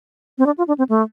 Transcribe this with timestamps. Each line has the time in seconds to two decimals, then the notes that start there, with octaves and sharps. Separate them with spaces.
0.38 C4
0.46 D4
0.58 F4
0.68 D4
0.78 C4
0.89 A3